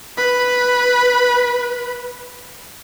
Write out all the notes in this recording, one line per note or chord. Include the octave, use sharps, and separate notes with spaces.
B4 B5